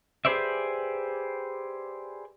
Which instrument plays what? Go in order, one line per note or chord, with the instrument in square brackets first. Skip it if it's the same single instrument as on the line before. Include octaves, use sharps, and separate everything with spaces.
[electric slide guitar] G4 G#4 B4 C5 D5 E5